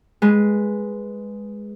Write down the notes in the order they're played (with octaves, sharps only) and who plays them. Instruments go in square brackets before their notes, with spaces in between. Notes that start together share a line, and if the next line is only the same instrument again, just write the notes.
[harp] G#3 B4